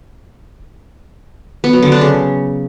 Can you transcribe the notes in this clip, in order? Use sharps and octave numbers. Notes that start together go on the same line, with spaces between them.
B3
F#3
D3
D4
C#3